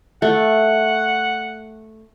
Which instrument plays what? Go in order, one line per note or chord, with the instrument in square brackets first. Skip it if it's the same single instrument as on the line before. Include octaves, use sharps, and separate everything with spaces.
[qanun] A3 [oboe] F#5